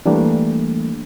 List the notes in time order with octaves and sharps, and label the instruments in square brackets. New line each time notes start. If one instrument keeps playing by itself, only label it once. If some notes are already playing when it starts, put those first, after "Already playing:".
[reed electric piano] E3 G3 A3 A#3 D4